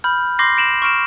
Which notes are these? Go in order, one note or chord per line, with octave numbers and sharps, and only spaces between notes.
B5 F6 G6
C6 D6 G6 A#6 C7
A#6 D7 E7 F#7
C#6 F6 D7 E7